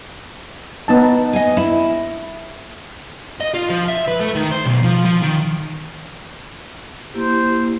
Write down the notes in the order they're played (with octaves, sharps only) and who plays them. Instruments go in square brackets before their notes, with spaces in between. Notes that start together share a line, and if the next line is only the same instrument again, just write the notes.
[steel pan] B3 D#4 A5
[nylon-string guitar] D#5 G#5
E4
[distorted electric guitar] D#5
F4
F3
E5
B4
A3
D#3
C5
B1
F3
F3
D#3
[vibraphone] A#3 E4 G4 [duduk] C5